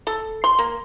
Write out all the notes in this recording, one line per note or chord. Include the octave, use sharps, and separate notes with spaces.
A4
C6
A#3